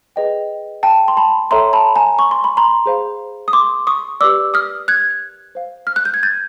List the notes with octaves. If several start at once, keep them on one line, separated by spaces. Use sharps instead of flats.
G#4 B4 D#5 G5
G5 A5
C6
A5 B5
A4 C#5 E5 G5 A#5 C6
A5 B5
G#5 A#5
C#6
C6
B5
A#5 C6
G#4 C5 F5
D#6
C6 D6
C#6 D#6
G4 B4 D5 D6 E6
D#6 F6
F#6 G#6
C5 F5
F6
F#6
G6
G#6
G6 A6